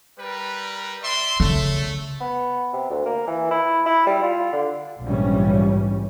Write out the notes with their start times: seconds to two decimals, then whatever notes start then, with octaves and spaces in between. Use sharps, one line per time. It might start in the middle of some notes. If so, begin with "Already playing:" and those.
0.18 G3 A#4 B4
1.02 D5 E5 C6
1.40 C#3 A3
2.21 B3
2.73 C3
2.90 D2
3.06 A#3
3.27 E3
3.51 E4
3.86 E4
4.07 G3
4.23 F4
4.53 D3
5.03 A#1 G#2 C3 E3 G3 C#4